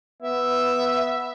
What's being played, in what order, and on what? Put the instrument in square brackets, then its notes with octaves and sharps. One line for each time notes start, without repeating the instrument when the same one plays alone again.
[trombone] B3 [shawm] E5